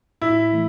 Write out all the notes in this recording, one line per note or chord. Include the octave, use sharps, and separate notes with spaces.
A2 E4
E3 A3